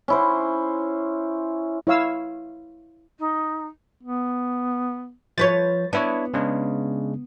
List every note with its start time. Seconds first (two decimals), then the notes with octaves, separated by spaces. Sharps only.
0.08 C#4 E4 C5
1.87 E4 C#5 F5 E6
3.18 D#4
4.03 B3
5.38 F3 B4 C#5 A6
5.93 B3 D4 E4 C#5
6.34 C#3 G#3 D4